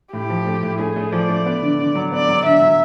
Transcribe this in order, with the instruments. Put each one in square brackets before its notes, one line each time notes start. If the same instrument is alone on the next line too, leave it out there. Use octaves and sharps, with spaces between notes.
[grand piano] A2 [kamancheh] G4
[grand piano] F3
A3
A2
[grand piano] A3 [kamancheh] G#4
[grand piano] A3
[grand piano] F3 [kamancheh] D5
[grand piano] A3
B3
D3
D3
F#3
[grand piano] B3 [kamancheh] D5
[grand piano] F#3
[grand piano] D3 [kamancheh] E5
[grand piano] F#3